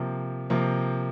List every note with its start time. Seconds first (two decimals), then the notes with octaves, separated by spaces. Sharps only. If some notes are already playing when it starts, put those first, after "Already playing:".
Already playing: C3 F3 A#3
0.50 C3 F3 A#3